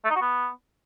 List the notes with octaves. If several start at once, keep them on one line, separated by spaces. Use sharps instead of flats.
A3
D#4
F#4
B3